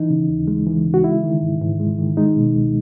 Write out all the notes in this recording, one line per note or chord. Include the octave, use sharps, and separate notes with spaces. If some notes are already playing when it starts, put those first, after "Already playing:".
Already playing: E3 D#4
C#3
D#2
G#3
E3
C#3
F#4
G#3 E4
D#3
G#2
G#2
G#3
D#3
G#3 D#4
B2
C#2